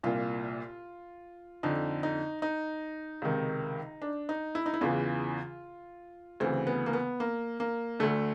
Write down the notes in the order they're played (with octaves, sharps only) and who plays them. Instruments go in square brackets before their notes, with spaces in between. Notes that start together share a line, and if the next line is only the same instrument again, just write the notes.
[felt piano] C2 A#2 F4
F2 D3 D#4
D#4
D#4
C#2 C3 D#3
D4
D#4
E4
D#4
E4
E2 C#3 E3 F4
D2 C#3 E3 C4
B3
A#3
B3
A#3
A#3
D2 D3 A3